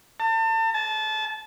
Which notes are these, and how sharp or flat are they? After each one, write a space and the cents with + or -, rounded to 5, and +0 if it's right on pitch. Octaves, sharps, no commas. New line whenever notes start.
A5 +35
A5 -25